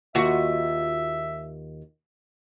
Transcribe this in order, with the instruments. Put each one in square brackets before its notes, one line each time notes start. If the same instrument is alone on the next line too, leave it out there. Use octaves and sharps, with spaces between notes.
[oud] D#2 F4 F#4 [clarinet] E5